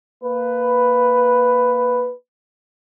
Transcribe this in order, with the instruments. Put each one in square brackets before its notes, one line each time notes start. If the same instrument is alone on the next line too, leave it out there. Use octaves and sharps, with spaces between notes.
[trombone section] A#3 B4